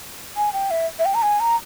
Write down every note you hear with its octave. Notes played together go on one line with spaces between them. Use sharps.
G#5
G5
E5
E5
G5
A#5
G#5
A#5